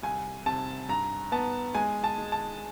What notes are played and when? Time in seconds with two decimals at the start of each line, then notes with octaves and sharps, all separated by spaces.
0.03 C2 G#5
0.46 C3 A5
0.89 G2 A#5
1.32 B3 A5
1.75 G#3 G#5
2.04 A5
2.18 G#3
2.32 A5